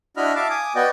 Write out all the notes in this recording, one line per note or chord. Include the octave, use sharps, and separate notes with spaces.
D4 E4 F#4 D#5 B5 F6
E5 F5 A5 D6
G#5 D6 D#6
B3 F#4 D5 D#5 G5